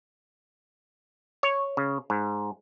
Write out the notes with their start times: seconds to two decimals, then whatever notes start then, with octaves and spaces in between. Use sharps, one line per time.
1.43 C#5
1.77 C#3
2.10 G#2